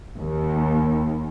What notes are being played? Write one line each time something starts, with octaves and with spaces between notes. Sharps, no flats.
D#2